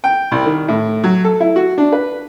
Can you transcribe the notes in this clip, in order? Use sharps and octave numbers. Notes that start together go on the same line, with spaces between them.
G5
C2
D#3
A2
F#3
A4
E4
F#4
D4
B4